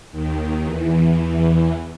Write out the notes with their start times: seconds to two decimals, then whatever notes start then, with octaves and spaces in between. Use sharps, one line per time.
0.11 D#2 D#3
0.64 E2 E3